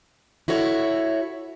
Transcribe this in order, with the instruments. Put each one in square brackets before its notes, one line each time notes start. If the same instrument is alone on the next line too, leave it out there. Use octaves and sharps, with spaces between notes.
[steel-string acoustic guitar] E4 F#4 A4 C#5